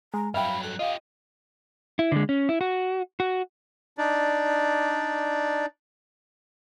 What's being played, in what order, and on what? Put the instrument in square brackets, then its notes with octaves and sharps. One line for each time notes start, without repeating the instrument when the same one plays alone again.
[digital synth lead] G#3 [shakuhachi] A#5
[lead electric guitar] G2 F#3 [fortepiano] E5 G5 [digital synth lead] F5 [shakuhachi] B5
[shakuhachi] A4 [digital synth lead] F#6
[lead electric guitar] F4 G4 [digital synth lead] D#5 [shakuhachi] F5
[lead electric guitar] E4
D3 G#3
C#4
E4
F#4
F#4
[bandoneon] D4 D#4 D5